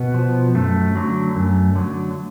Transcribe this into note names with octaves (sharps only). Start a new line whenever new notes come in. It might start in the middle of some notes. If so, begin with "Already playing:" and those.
Already playing: B2 B3
F3
F#2 A3
D3 F#3
F#2
D3 F#3